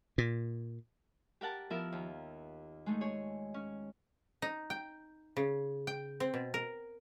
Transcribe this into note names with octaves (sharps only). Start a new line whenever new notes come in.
A#2
G4 A#4 F#5 A5
F3 B3 E4 A#4 E6
D#2
G#3 A3 D#4
G#4 C#5
C#4
D#4
G5
C#3
G5
C4
B2
A#4